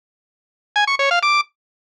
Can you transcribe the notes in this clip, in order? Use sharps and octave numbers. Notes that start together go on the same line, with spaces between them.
G#5
C#6
C#5
F5
D6